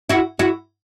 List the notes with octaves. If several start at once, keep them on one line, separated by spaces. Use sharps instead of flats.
E4 F#4
E4 F#4